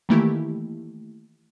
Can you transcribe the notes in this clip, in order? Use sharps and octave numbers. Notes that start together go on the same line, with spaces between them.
D#3 E3 A3 A#3 E4 G4